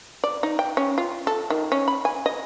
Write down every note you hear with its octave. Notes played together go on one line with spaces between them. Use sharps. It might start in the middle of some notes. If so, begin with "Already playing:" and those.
D5
D#4
G5
C#4
F4
A4
D#3
C#4
B5
G#5
D#5